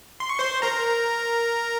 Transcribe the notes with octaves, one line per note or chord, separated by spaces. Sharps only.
C6
C#6
C5 C6
A#4 A#5